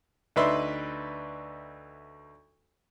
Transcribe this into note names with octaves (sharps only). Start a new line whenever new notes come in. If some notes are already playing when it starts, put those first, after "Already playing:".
D2 D#4 B4 D5 E5 C6